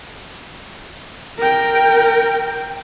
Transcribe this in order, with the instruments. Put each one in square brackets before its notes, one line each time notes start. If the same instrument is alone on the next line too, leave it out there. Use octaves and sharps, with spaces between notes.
[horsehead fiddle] A#4 G5